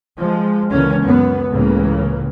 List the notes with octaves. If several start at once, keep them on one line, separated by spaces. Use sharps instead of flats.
F3 G#3
C#2 D3 E3 A#3 C#4
F#2 B3
C#2 A2 C#3 E3 A#3